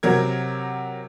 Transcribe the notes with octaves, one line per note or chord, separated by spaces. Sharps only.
C3 F#3 A#4 G#6